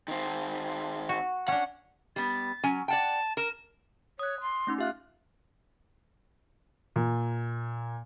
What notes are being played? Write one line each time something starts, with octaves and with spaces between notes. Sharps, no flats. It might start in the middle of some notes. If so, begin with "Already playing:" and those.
D#3 C4
F#4
C#4 D4 F#5
G3 B3 A6
F#3 C#4 G#5
D5 F#5 G5 A5
A#4 E7
C#5 D#6 F#6
C6
A3 C#4 D#4
F4 G4 E5 F#6
A#2